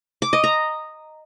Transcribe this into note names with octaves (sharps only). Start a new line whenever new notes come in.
D6
D#5
A#5